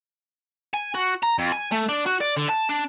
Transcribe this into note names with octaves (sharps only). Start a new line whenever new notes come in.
G#5
F#4
A#5
F2
G#5
A3
D4
F#4
D5
D3
A5
D4